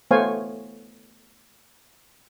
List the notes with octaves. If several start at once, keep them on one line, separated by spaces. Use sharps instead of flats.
A3 B3 C5 C#5 F5 G#5